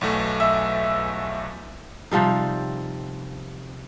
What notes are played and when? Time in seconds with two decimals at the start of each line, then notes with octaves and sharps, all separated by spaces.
0.01 B1 E2 A3
0.40 E5
2.11 C3 F3 G3 D#4